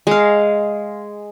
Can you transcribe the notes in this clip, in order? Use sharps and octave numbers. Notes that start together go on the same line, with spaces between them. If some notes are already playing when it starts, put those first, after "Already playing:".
G#3 F5